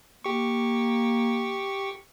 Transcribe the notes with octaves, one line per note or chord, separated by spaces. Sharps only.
A#3 G4 C#6